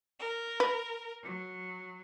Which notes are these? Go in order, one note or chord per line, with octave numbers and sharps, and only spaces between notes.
A#4
B4
F#3